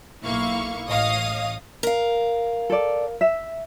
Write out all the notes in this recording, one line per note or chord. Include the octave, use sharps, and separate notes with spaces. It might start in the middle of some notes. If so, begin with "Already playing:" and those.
B1 A#3 E4 F5 C#6
A1 C#5 D#5 F5 D#6
A#4 F5
A4 D5
E5